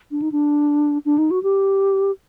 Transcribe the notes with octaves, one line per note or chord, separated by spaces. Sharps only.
D4
D#4
D4
D4
D#4
F#4
G4